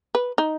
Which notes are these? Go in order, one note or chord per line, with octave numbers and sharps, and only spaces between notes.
B4
D#4